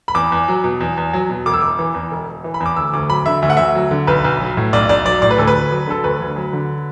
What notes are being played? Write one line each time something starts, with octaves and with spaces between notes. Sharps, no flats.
B5
E2 D6
E2
F#3
B2
E2
E2
F#3
B2
E1 D6
E6
E1 D6
E3
E2
E1
E1
E3
B5
E2
D6
D2 E6
D2 D6
F#3 B5
D3 E5
D2 E5
F#5
D2 E5
F#3
D3
B1 B4
B1
F#3
A2
B1 D5
B1 D5
F#3 D5
A2 D5
B4
D2 A4
B4
D2
F#3
D3 A4
D2 B4
D2
F#3
D3